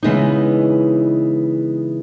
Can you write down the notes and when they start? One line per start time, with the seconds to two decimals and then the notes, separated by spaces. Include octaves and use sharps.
0.03 C#3 E3 G#3 B3 D#4